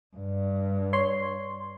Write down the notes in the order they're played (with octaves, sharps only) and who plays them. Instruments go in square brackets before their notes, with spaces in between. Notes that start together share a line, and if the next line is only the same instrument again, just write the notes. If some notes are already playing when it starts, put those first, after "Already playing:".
[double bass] G2
[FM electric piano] C#5 C6